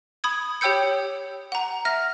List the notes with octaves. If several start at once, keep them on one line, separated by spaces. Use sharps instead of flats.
B5 D#6 G#6
G4 C#5 G5 E6 G6 C#7
F#5 A#5
E5 F6 A#6